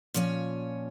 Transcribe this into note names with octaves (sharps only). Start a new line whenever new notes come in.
A#2 F3 C#4 C#5 G#5